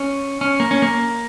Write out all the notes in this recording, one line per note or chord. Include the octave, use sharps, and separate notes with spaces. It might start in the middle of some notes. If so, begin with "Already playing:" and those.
Already playing: C#4
C#4
A#3
C#4
A#3